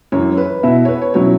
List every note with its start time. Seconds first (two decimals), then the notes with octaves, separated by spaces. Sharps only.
0.12 F#2 E3 C#4 C#5
0.37 B4
0.63 B2 B3 E4 E5
0.85 C#5
0.89 B4
1.02 C#5
1.14 B2 F#3 C#4 E4 C#5